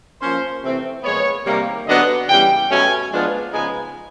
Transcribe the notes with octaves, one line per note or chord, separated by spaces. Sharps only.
F3 A#3 C#4 C5
C3 E3 A3 C4
A#2 F3 G#3 B3 C#5
C3 D#3 G3 A#3
D3 F#3 B3 D4 D#5
C#3 E3 G3 B3 G5
B2 F#3 A3 C#4 G#5
F3 G#3 B3 D4 F4
C#3 F3 G#3 B3 D#4 G#5